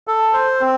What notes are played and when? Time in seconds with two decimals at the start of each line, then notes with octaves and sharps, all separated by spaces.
0.07 A4
0.33 C5
0.61 C4